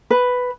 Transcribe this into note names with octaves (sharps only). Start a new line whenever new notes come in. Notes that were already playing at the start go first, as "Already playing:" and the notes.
B4